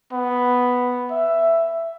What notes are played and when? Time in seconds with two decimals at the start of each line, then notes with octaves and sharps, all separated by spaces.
0.13 B3
1.11 E5